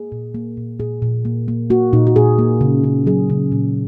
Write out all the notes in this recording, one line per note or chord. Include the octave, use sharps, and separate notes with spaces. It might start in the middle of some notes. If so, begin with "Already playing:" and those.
Already playing: A#3 G#4
A#2
A#3
A#2
A#2 G#4
A#2
A#3
A#3
A#3 F#4
A#2 D#4
F#4
A#2 G#4
A#3
C#3
C#3
F#3 G#4
C#3
A#2